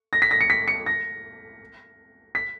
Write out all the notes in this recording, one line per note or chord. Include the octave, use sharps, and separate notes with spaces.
A#6
B6
A#6
C#7
B6
C#7
A#6
B6